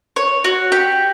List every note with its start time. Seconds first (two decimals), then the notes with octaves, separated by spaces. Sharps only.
0.16 C#5
0.44 F#4
0.72 G4